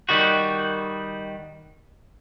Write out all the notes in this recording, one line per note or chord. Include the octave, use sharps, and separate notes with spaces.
D#3 G3 F#4